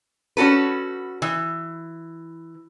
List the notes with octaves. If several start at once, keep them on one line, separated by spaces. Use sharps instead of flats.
C#4 F#4 A4 B4
E3